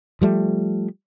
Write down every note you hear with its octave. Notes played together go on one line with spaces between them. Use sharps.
F3 G3 A3